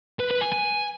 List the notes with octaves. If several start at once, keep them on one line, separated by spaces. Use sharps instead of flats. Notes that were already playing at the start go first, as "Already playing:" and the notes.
B4
B4
G#5
G#5